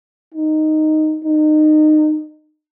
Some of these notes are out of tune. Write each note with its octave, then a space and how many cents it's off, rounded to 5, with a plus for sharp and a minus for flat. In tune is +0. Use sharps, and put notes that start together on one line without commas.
D#4 -5
D#4 -25